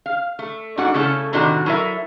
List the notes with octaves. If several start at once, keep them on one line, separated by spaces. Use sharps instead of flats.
F5
A3
G#2 D4 F#4 F#5
C#3 A3 C#4 E4 A4
A2 C3 D#3 D4 F#4 A5
F#3 E4 A4 A#4 E5